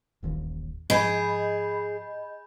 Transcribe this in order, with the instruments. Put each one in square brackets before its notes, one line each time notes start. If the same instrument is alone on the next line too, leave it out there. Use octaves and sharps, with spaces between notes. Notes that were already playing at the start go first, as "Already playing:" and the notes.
[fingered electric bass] D#1 A1 D#2
[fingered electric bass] G#2 F3 D4 [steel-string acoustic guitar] G#4 [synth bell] D#5 B5 G6